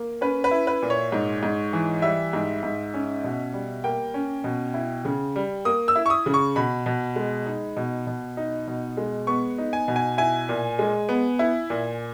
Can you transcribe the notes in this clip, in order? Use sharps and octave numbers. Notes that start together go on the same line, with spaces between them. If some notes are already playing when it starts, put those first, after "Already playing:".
Already playing: A#3
C#4 B4
B4
E4
B4
A#2
C#5
G#2
G#2
E3
G3 E5
G#2
G#2
C#4
B2
G3
A#3 G5
C#4
B2
E4
C#3
G3
A#3 D#6
E6
E4
C#6
D#6
C#3
C#6
B2 B5
B2
G#3
D#4
B2
B2
D#4
B2
G#3
B3 C#6
D#4
G#5
B2
G#5
E4 G#5
A#2
G#3
B3
E4
A#2